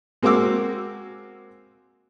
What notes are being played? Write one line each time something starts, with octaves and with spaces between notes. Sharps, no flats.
G#3 A#3 C4 F#4 D6 E6